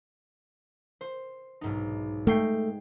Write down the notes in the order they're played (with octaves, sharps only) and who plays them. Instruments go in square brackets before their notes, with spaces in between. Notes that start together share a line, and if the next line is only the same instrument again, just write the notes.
[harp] C5
B1 G#2 D#4
[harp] G#3 G5 C7 [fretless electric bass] A3